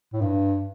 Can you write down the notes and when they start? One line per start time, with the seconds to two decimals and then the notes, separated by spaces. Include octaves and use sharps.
0.13 A2
0.21 G2